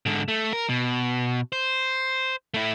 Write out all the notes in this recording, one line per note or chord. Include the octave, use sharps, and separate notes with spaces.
G#2 D3
A3
A#4
B2
C5
A3 E4